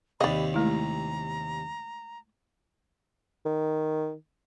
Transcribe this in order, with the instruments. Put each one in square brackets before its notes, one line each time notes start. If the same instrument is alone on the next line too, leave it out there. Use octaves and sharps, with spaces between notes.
[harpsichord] D#2 C3 [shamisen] D5 D#5 [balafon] F5 [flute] B5
[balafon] G#3 A3 E4 [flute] A#5
[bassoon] D#3